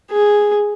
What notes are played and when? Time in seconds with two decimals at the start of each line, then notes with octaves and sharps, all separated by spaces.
0.11 G#4